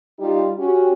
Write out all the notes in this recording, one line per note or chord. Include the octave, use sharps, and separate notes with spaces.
G3 D#4 F4 G4
C#4 F#4 G4